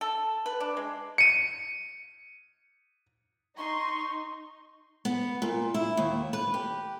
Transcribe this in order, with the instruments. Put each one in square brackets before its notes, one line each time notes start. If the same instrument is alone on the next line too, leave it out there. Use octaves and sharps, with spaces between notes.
[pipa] A4
B4
D4
G#3
[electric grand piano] C#7 D#7
[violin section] D#4 [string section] C6 [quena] C#6
[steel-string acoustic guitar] B3
A#2
E4
D#2
B4
G4